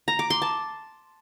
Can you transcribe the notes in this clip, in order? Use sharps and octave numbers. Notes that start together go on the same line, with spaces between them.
A#5
D6
C6
A5